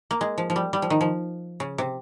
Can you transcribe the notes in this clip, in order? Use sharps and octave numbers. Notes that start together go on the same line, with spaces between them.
A#3
G#3
F3
F3
G3
G3
F3
D#3
F3
C#3
C3